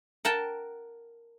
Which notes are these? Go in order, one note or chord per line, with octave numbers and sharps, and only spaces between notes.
A#4 F#5 G5 A5